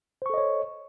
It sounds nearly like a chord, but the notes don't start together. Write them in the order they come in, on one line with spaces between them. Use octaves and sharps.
C5 C#6 A4 D#5 C#5